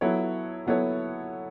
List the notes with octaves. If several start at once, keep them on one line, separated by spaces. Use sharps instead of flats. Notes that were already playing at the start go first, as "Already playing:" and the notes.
F#3 B3 E4 A4 C#5
F#3 B3 E4 A4 C#5